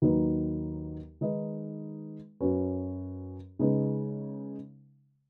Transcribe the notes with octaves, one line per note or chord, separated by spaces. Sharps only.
D#2 D#3 F#3 D#4 B4
D#3 G#3 D#4 B4 D#5
F#2 F#3 C#4 F#4 B4
C#3 G#3 D#4 B4